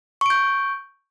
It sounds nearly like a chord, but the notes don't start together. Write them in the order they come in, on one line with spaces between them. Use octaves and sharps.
C#6 D7 G6